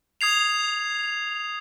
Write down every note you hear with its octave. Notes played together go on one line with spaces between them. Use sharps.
D#6 G#6 C7 F7